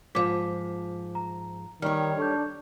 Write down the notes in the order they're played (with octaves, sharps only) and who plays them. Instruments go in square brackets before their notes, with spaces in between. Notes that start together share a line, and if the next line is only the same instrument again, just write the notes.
[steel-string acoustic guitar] G#2 F3 [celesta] D6 B6
[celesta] A#5
[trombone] D#3 [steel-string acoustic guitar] G3 C#5 [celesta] F6
[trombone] D4 [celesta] A4 C#6 G6